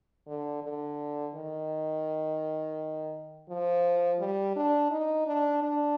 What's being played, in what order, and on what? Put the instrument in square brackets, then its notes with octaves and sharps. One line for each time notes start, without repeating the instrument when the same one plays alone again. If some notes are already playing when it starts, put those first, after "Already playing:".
[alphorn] D3
D3
D#3
F3
G3
D4
D#4
D4
D4